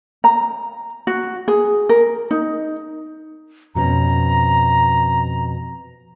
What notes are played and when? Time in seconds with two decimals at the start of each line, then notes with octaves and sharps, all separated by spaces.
0.24 A#5
1.07 F#4
1.48 G#4
1.89 A#4
2.31 D#4
3.75 F2 B2 C#4 A#5